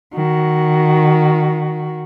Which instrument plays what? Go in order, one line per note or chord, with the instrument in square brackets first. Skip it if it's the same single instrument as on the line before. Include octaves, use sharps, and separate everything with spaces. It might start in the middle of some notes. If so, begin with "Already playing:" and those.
[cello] D#3 F#4